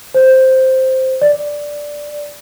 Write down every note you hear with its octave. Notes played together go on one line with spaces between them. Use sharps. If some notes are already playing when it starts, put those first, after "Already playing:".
C5
D5